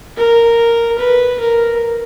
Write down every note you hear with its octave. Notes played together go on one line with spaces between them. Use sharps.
A#4
B4
A#4